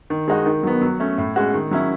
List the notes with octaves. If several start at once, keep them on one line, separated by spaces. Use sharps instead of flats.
D#3
G#3 D#4 F#4
D#3
F#3 B3
F#3
A3 C#4
A2
G#3 C#4 F#4
D#3
F#3 C#4 E4